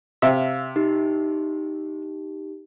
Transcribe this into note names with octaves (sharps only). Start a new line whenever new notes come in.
C3 E5 F5
D#4 G4